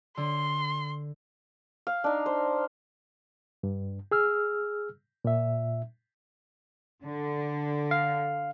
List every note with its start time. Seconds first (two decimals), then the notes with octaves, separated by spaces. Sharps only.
0.17 D3 C6
1.87 F5
2.04 D4 D#4
2.26 C5
3.63 G2
4.11 G#4 E6 F6
5.25 A#2 E5
7.03 D3
7.91 F5